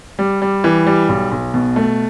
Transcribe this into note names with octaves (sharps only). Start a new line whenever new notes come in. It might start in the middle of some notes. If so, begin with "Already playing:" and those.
G3
G3
E3
G3
B1
B1
B2
A3